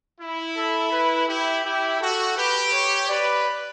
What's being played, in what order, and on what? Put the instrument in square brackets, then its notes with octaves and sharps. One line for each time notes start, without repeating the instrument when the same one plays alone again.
[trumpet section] E4
[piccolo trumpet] A4
B4
[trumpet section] E4 [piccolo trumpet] G4
[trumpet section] E4 [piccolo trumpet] G4
[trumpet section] F#4 [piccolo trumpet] A4
[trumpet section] G4 [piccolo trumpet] B4
[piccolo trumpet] C#5
[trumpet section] B4 [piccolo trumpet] D5